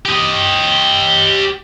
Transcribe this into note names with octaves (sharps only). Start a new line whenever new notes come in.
G4 D#5